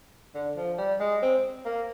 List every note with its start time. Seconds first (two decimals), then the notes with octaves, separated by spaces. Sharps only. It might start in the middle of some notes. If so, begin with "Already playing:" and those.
0.34 D3
0.56 F3
0.78 G3
1.00 G#3
1.22 C4
1.65 A#3